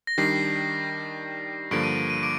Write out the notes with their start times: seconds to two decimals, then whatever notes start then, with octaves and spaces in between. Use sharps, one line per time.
0.07 A#6
0.18 D#3 G3 D4 C7
1.71 G2 D3 F3 A#3 D7
1.84 D#7
1.97 D7
2.10 D#7
2.23 D6 D7